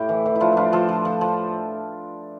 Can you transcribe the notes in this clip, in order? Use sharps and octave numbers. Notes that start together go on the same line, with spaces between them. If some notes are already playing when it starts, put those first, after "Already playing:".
Already playing: A2 E4 G4
E3
E3
E4
F3 D4 F4
F3 D4 E4 F4
F3 F4 A4
F3
F3
F3